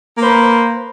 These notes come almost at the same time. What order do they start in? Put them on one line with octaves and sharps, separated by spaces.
A#3 C5 B4